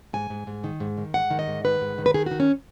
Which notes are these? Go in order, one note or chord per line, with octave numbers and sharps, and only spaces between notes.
G#2 G#5
G#2
G#2
D#3
G#2
D#3
G#2 F#5
D#3
D#5
G#2
D#3 B4
G#2
D#3
B4
D#3 G#4
D#3 F#4
C#4